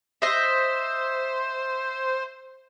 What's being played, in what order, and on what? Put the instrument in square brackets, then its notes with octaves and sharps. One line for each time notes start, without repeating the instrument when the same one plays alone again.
[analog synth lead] C5 [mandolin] D#5 E5